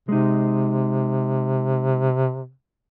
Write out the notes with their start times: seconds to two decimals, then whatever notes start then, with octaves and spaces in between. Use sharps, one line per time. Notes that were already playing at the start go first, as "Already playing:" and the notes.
0.09 C3 G#3 D#4